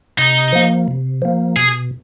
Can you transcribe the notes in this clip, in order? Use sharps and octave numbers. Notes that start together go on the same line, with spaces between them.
C3 D#4
F3 A#3
C3
F3 A#3
B2 G#4